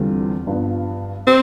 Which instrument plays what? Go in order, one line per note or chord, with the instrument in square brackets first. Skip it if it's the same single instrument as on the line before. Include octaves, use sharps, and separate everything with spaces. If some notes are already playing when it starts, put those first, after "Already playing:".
Already playing: [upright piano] E2 D3 G3 C4 F4
G2 F3 B3
[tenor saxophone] C4